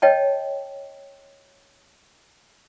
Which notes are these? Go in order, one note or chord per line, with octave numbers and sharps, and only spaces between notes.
C#5 D#5 G5 A5